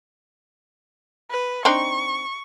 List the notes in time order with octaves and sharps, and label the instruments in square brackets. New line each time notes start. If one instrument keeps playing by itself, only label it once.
[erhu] B4
[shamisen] C4 D4 D#4 [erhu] C#6